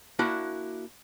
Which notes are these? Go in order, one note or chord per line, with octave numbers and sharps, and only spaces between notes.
A#3 D4 E4 F#4 B5